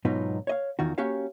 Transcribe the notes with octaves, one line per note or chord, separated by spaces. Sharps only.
G#2 B2 F#3 B3 D#4 F4
C#5 D#5 F5
E2 D#3 F4 F#4
A#3 C#4 F#4 G4 C#5 F5